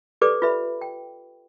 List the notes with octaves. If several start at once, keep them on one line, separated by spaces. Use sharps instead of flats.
G4 A4 B4 D5 D6
F4 B4 E5 B5
G5